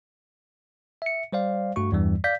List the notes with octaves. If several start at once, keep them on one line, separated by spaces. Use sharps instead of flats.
E5 C#7
G3 C5 D5 F5
G2 A3 F#4 C#6
E2 G2 E3 G3
D5 F5 G6 B6